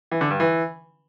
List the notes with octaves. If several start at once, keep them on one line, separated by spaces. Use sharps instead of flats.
E3
D3
G2
E3